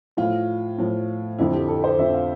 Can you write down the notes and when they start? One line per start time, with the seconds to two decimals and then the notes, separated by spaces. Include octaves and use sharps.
0.17 A2 F3 F4
0.78 A2 F3
1.39 F2 D3 F3 E4
1.53 G4
1.68 A4
1.84 C5
1.99 F2 D3 F3 E5
2.14 F5